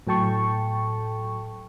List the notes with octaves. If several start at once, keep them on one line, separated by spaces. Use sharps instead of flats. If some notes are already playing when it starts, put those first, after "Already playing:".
A2 F#3 A4 G5 A5 C#6